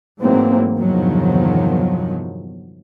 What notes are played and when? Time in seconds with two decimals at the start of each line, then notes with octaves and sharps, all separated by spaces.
0.21 G#2 E3 F#3 A3 A#3 C4
0.78 G1 E2 C3 D#3 F3 F#3